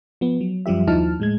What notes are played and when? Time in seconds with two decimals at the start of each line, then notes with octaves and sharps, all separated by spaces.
0.21 F3 B3
0.41 F#3
0.66 F#2 F3 G3 G4 E5
0.87 D#2 F3 D#4 E4 A5 F6
1.20 A2 G#3 G#6